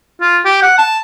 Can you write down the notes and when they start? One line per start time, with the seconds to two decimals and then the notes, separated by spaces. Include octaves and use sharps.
0.21 F4
0.45 G4
0.62 F#5
0.78 A5